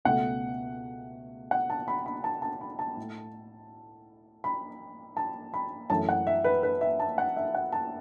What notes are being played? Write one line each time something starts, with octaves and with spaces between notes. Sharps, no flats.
C#2 B2 A3 F#5
F#5
A5
B5
B5
A5
A5
B5
A5
A2
A3
B5
A5
B5
F#2 E3 A3 A5
F#5
E5
B4
B4
E5
A5
F#5
E5
F#5
A5